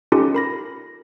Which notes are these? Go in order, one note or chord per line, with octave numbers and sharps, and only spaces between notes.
C#4 D#4 F4 G4 A4
A#4 B5 A#6